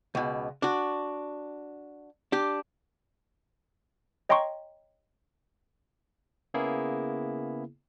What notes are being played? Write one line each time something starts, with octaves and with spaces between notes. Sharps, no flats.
C#2 B2
D4 F#4
D4 G4
C#5 D#5 G5 A#5 C6 C#6
C#3 A#3 B3 E4 G#4